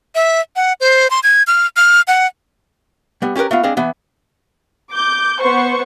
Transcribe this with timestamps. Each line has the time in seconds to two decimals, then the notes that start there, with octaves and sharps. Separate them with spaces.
0.15 E5
0.56 F#5
0.81 C5
1.11 C6
1.23 G#6
1.47 F6
1.76 F6
2.08 F#5
3.22 G3 B3
3.36 C#4 G4 G#4 A#4 B4
3.51 A3 B3 F4
3.63 G#3 C4 D4 G#4 F5
3.77 E3 B3
4.91 D6 G6
5.40 B3 C5 C#6